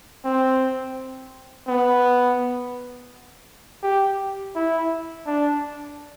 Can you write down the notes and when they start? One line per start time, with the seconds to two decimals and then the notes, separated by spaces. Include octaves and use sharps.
0.25 C4
1.68 B3
3.83 G4
4.55 E4
5.27 D4